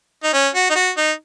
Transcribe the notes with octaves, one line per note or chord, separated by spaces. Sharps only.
D#4
C#4
F#4
D#4
F#4
D#4